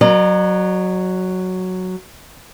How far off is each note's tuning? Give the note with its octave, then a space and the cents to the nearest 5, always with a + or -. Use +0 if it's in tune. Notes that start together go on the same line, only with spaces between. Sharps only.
F#3 +0 A#4 +30 D#5 -45